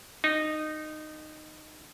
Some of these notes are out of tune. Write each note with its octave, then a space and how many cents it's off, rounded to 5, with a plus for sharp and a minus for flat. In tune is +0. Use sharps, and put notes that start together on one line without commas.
D#4 -15